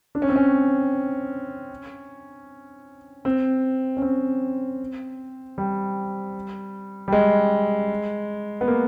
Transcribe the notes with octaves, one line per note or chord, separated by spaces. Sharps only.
D4
C#4
C4
C#4
C4
C#4
C4
G3
G3
G#3
B3
A#3